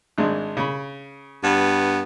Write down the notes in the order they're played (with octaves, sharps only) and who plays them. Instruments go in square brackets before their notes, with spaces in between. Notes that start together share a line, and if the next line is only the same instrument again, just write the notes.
[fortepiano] G#1 G#3 D4
C#3 B5
[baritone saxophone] G2 [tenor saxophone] B3